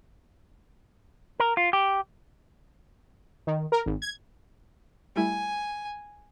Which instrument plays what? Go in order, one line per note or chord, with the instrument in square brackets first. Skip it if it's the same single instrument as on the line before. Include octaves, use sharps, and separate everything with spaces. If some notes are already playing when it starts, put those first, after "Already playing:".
[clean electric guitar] A#4
F4
G4
[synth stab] D#3
A#4
G#1
G#6
[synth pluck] G3 A3 E4 [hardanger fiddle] G#5